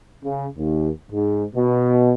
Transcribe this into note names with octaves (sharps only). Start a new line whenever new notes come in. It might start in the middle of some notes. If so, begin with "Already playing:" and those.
C#3
D#2
G#2
B2